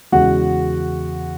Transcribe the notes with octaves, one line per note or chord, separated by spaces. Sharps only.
E2 C#3 G#3 F#4 F#5